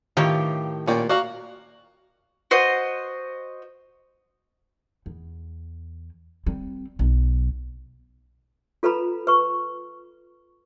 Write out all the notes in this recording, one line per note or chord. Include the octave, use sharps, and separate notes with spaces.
A2 D#3 F4 G4 B4 C#5
A#2 C#4 D5 G5
F#4 D5 F5 A#5
F#4 C5 D#5
E2
G3 C4
B1 F#3
F4 A4 B4 A#5 B5
B4 C#6